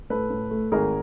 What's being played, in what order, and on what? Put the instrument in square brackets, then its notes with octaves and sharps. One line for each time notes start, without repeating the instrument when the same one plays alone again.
[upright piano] A2 A4 B4
A2
A3
G#1 G#4 A#4